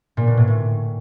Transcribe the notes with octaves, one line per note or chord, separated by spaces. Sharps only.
A#2
B2
A2
A2